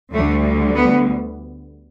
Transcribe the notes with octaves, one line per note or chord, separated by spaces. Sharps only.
D2 D3 G3 A3
B3